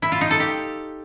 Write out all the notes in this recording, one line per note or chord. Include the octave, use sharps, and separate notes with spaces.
E4
F4
D#4
A4
G4